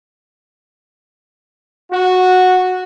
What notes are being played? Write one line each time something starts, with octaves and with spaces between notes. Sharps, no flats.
F#4